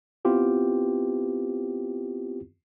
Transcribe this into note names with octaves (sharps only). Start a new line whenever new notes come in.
B3 C4 E4 F4 G4 B4